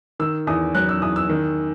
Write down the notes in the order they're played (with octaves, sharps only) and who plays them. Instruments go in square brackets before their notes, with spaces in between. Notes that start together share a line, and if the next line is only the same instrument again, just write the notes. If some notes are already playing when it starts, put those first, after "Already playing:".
[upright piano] D#3 E6
E2 D#6
F#3 F#6
E6
E2 D#6
E6
D#3